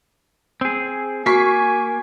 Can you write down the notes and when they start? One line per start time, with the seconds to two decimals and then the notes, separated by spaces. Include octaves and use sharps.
0.61 C4 G#4
1.26 A#3 F#4 G#5 C#6 B6 C7